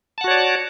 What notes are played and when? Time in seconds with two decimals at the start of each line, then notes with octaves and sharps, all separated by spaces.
0.18 A5
0.21 F#5
0.24 F#4
0.28 C#5
0.31 D5